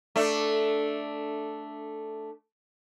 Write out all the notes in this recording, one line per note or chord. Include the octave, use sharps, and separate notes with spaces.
A3 D4